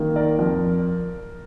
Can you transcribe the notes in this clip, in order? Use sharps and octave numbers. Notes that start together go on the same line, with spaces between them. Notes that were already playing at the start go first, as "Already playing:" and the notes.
Already playing: D#3 A#3
A#4 D5
F2